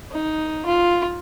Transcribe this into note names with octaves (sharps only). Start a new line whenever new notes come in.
D#4
F4